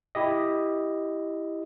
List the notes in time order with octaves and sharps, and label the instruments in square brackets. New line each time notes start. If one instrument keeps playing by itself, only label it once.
[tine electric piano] E4 G4 D#5